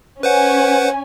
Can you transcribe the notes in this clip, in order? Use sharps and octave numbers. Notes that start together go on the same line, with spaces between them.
C#4 B4 C5 F#5 G#5